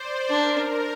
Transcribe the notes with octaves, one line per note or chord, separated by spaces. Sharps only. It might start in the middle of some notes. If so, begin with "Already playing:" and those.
Already playing: C5 D5
D4 A#4